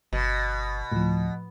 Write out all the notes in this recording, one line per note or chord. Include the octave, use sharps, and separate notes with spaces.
G1 B2
D2 A2 F3